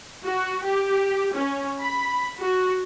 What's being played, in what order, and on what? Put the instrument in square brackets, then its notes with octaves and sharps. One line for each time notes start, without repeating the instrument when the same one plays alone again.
[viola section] F#4
G4
C#4
B5
F#4